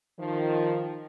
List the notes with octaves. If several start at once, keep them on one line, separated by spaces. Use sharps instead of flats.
D#3 F3